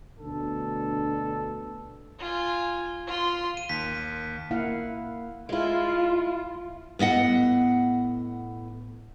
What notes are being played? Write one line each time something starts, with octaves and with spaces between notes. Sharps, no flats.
D2 B2 D4 A4
F4 G#5
F4 C6
D#7
D#2 B6
A#3 E4 F5 F#5
G#3 E4 F4
A2 B3 D#5 F#5